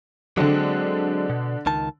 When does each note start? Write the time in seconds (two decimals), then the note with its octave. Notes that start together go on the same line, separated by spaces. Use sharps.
0.37 D3 F#3 G#3 C4 D4
1.30 B2
1.66 C#2 D#3 A5